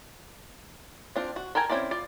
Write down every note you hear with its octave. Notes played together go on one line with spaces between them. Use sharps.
C4 D4 F4
F#4
A4 A#4 G5 G#5 A#5
C4 C#4 E4 D5
F4 D5